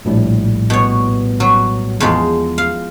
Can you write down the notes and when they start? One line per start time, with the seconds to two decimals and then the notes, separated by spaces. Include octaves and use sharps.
0.05 A#1 A2 G3
0.70 B2 C#5
1.40 F#3
2.00 E2 F3 G#3
2.58 F5